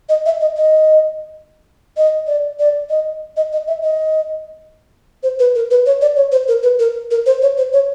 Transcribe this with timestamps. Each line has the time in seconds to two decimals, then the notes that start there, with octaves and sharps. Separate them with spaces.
0.09 D#5
0.26 E5
0.41 D#5
0.57 D#5
1.97 D#5
2.27 D5
2.59 D5
2.90 D#5
3.37 D#5
3.53 D#5
3.68 E5
3.83 D#5
5.23 C5
5.39 B4
5.55 A#4
5.71 B4
5.86 C#5
6.01 D5
6.16 C#5
6.32 C5
6.48 A#4
6.63 B4
6.79 A#4
7.11 A#4
7.26 C5
7.42 C#5
7.57 C5
7.73 C#5